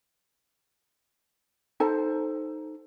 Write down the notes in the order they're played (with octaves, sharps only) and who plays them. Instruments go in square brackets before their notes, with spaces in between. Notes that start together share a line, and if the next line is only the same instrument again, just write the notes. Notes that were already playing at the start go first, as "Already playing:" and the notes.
[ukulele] D#4 A4 C5 A5